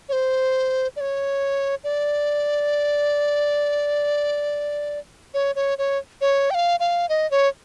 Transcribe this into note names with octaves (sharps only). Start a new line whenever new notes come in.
C#5
C5
D5
C#5
D5
C#5
C#5
C#5
C#5
G5
F5
F5
D#5
C#5